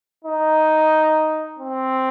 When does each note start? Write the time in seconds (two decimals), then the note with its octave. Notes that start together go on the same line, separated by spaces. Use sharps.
0.24 D#4
1.59 C4